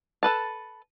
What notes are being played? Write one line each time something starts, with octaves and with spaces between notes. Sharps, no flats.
A4 B4 A5